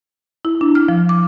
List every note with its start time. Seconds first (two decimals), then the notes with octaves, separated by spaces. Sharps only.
0.45 E4
0.61 D4
0.75 F6
0.88 F3
1.09 D6